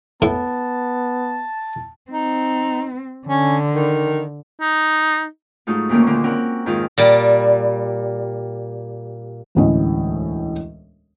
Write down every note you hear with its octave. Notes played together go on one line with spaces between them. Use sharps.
A2 B3 A5
C4 D#4
D3 C#4
D#3
D#4
G#2 F#3 A3 D#4 F4
D2 A#2 D#3 A3 A#3 C#4
A#2 D3 D#3 A#3
C4 C#4 A#4 F#5
F2 G#2 D#3 F4 A#4
A#2 G3
E1 D2 A2 C#4 D#5